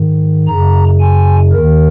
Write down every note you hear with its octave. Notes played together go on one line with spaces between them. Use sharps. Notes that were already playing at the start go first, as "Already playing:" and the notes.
Already playing: G#2 D#3
F#2 C#3 A#5
G#5
D#2 D#3 A#4